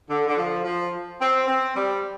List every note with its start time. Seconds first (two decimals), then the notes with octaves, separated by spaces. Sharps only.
0.10 D3
0.28 D3
0.37 F3
0.64 F3
1.20 C4
1.48 C4
1.75 G3